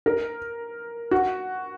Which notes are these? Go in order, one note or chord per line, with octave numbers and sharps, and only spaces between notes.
A#4
F#4